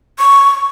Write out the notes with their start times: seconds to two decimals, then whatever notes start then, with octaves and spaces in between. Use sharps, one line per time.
0.19 C#6